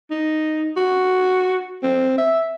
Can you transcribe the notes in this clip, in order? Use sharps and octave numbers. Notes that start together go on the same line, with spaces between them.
D#4
F#4
C4
E5